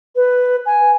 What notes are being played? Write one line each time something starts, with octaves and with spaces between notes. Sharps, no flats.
B4
G#5